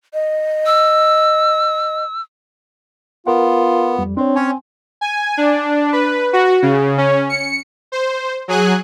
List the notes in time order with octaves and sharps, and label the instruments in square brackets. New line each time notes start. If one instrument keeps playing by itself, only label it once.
[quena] D#5
[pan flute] E6
[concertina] B3 [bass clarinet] F4 [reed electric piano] A#4 F#5
[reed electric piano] F2 G3
[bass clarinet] C4 [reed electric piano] D4 C#5
[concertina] C#4 C#5 [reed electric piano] G#5
[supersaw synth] G#5
D4
B4
F#4
C#3
C#4
C#7
C5
F#3 G#4 G#5 F#6